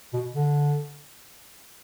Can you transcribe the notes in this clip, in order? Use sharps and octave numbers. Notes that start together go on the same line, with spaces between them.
B2
D3